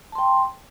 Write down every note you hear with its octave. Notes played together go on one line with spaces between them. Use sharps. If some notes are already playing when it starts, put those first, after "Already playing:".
G5 A5 C6